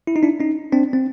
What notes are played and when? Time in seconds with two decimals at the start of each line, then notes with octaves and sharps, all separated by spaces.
0.07 E4
0.16 D#4
0.23 D4 E4
0.40 C#4 D#4
0.72 C4 D4
0.93 C4